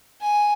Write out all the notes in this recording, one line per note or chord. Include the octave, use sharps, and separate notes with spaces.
G#5